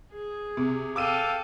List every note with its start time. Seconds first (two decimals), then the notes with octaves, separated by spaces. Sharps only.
0.12 G#4
0.57 C3
0.96 A4 F5 G5 D6 E6 D#7